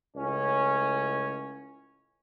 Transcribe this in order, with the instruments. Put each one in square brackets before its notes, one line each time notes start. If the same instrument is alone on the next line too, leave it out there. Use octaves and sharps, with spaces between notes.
[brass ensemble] C#2 A2 C#4